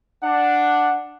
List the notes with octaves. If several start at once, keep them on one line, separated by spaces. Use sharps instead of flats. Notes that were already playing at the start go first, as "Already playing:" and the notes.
D4 F#5